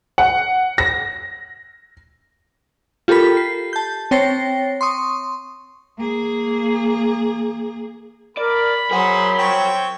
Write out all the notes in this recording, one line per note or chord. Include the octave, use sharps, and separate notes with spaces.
F#5
A#6
F4 G4 A4 A#4 B5 B6
C7
A5 G6
C4 C#5 G5 A6 A#6 C7
C6 C#6 D#6
A#3 G#4
A#4 D5 B5
F#3 G#4 A#4 C5 F#5
C4 C#5 G5